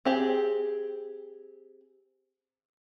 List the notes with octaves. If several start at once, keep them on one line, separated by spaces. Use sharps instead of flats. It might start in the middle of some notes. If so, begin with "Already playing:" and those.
C4 G4 G#4